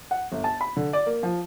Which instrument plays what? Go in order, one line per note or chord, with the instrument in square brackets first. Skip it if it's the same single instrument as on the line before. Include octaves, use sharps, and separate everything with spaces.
[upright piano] F#5
G1
A5
B5
D3
D5
A#3
F3